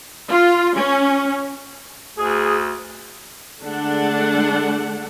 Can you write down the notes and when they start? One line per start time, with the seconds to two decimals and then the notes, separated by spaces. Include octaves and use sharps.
0.28 F4
0.76 C#4
2.17 D2 G#4
3.63 D3 G#3 A3 D4 F#5